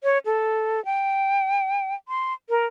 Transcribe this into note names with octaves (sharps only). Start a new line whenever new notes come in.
C#5
A4
G5
C6
A#4